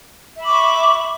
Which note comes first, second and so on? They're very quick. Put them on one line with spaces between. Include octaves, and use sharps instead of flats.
E5 B5 D6 C#6